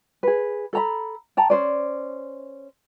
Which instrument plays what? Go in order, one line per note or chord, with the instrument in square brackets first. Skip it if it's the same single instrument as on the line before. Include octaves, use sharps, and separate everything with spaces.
[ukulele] G#4 B4
A4 A#5 B5
G5 A5 A#5
C#4 C5 D5